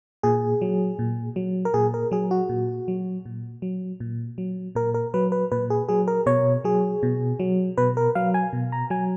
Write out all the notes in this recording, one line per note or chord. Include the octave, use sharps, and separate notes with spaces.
A#2 G#4
F#3
A#2
F#3
A#4
A#2 G#4
A#4
F#3 G#4
F#4
A#2
F#3
A#2
F#3
A#2
F#3
A#2 A#4
A#4
F#3 B4
B4
A#2 B4
G#4
F#3 G#4
A#4
B2 C#5
F#3 G#4
B2
F#3
B2 B4
A#4
F#3 F5
G#5
B2
A#5
F#3 G#5